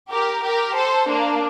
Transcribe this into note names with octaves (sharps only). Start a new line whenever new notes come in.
G4 A#4
G4 A#4
A4 C5
A#3 D4